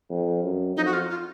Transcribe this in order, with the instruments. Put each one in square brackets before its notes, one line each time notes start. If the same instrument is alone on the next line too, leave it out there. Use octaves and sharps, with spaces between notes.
[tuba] F2
F#2
[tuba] F2 [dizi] D#4
[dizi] F#4
F4
F4